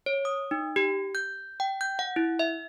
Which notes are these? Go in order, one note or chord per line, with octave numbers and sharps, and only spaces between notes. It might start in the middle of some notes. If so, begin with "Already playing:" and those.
C#5
D#6
D#4
G4
G6
G5
G6
F#5
E4
E5